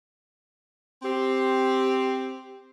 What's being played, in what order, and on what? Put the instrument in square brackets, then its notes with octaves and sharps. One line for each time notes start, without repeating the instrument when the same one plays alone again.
[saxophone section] C4 G4